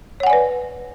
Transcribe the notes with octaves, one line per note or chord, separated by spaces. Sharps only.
B4 C#5 D5 F#5 G#5